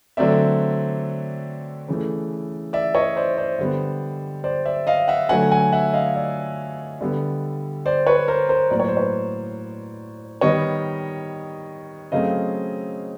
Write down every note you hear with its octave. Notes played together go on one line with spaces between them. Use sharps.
D3 F#3 A3 C4 D5 E5
C#3 E3 A3
D5 E5
C#5 D#5
C5 D5
C5 D5
D3 G3 B3
C5 D5
D5 E5
D#5 F5
E5 F#5
D3 F#3 A3 F#5 G#5
F#5 G#5
E5 F#5
D#5 F5
D5 E5
D3 G3 B3
C5 D5
B4 C#5
A#4 C5
A#4 C5
A2 F#3 A#3 D5
C#5
C5
B4 C#5
D#3 G3 B3 C#5 D#5
C#3 F#3 A3 C4 D#5 F5